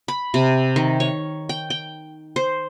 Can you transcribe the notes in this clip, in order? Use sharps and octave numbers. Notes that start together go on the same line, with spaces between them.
B5
C3
D#3
C#5
G5
G5
C5